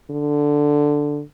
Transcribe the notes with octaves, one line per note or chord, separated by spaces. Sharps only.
D3